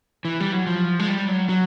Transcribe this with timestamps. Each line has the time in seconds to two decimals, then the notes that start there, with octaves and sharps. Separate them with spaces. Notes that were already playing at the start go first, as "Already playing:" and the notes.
0.25 E3
0.40 G3
0.53 F#3
0.67 F3
0.99 G#3
1.08 G3
1.28 F#3
1.49 F#3